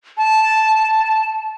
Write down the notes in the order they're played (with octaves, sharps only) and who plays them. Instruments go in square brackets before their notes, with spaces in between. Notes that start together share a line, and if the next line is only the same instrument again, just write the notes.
[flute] A5